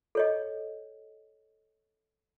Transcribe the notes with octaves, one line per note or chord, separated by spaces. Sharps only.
A4 C#5 D#5